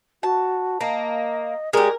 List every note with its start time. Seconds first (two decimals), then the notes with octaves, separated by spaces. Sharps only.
0.23 F#4 A5
0.81 A#3 D#5
1.73 G#3 G4 A#4 D5